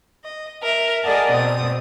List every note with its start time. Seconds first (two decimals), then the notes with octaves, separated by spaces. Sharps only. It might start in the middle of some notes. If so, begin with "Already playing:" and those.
0.24 D#5
0.62 A#4 E5
1.03 G#4 A#4 D5 D#5 F#5 A5
1.32 B2 C4 D#6